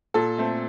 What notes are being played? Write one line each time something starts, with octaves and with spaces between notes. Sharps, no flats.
A#2 A4
A3 C4